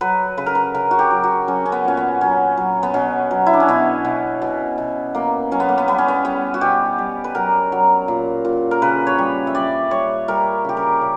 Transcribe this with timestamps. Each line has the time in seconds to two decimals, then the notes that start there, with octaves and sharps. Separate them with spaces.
0.01 F#3 B4
0.37 C#3 B4
0.46 A#4
0.55 B4
0.74 C#3 A#4
0.91 F#4
0.99 G4
1.11 F#3
1.24 F#4
1.48 F#3 C#4
1.66 C#4
1.72 B3
1.85 A#2 C#4
1.97 B3
2.21 F#3 C#4
2.57 F#3
2.83 B3
2.94 B2 C#4
3.31 F#3
3.46 E4
3.53 D4
3.60 C#4
3.68 B2 B3
4.05 B2
4.42 B2
4.78 B2
5.15 B2 A#3
5.51 F#3 C#4
5.60 B3
5.69 A#3
5.78 B3
5.88 G3 B3
5.98 C#4
6.08 B3
6.24 G3 B3
6.54 F#4
6.61 B2 G4
6.98 G3
7.24 B4
7.35 F#3 A#4
7.72 F#3
8.08 A#2
8.45 A#2
8.71 A#4
8.82 C#3 B4
9.07 C#5
9.18 G3
9.47 E5
9.55 G3 D5
9.91 G3 C#5
10.28 G3 A#4
10.65 C#3 G4
10.77 A#4
11.02 C#3